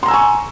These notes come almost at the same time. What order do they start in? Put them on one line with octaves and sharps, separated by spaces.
C6 A#5 E6 G#5 C#6